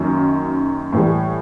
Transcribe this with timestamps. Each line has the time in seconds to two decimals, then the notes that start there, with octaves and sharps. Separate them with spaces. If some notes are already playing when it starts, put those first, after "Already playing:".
Already playing: F#2 D#3 F#3 A#3
0.93 A2 E3 G3